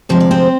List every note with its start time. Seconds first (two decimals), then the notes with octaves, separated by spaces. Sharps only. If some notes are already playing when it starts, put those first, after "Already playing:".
0.09 D2 C3 F3 G#3 C5
0.20 D5
0.31 C4 C5